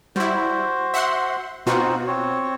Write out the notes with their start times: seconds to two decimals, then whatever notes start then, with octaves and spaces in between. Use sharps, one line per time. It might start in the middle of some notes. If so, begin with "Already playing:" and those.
0.16 G3 E4 F#4 C5
0.94 E5 F#5 C6
1.66 B2 C4 D#4 F4 F#4 C5
2.07 C4 C#5